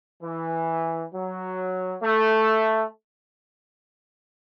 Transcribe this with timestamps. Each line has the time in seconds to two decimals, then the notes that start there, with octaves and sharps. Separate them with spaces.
0.22 E3
1.13 F#3
2.03 A3